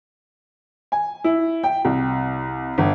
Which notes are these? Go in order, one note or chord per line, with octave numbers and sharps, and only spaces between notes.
G#5
E4
G5
C2
G1